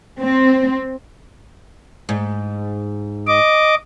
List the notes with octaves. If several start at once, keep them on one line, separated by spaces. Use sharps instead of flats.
C4
G#2
D#5 D6